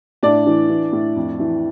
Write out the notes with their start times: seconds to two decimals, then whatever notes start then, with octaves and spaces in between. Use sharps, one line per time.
0.23 A2 D4 D5
0.46 E3
0.69 E3
0.93 A2
1.16 F2
1.40 E3